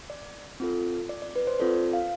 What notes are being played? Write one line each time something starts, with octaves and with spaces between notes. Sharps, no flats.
D5
C4 F4 A4
D5
D5
B4
C5
C4 F4 A4 D5
F5